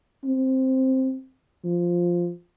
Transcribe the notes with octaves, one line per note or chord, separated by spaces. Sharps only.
C4
F3